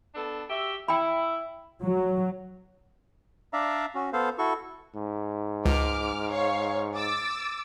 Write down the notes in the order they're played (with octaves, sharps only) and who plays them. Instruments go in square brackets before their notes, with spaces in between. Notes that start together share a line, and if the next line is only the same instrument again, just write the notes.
[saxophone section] B3 D4 A4
F#4 G4 E5
[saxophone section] E4 [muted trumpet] E5 [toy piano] G5 B5
[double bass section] F#3
[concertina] D4 D5 E5 F5 A#5
C#4 F#4
B3 A4 C5 F5
E4 F#4 A4 C#6
[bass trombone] G#2
[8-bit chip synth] C#2 [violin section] D6 F6
[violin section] C#5 F5 C#6
D6 E6 A6